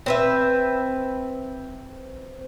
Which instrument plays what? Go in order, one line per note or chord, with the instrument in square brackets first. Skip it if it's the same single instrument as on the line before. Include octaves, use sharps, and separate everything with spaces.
[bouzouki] C4 B4 E5